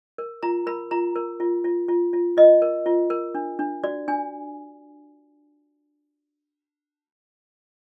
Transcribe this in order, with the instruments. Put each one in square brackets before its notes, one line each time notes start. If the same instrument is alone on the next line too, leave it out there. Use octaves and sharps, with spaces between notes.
[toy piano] A#4
F4 A#5
A#4 B5
F4 A#5
A#4
F4
F4
F4
F4
F4 D#5
A#4
F4
A#4
D4
D4
F#4 D5
D4 G#5